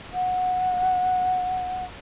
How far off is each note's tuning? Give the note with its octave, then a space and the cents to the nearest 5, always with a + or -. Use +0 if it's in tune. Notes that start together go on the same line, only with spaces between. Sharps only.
F#5 -15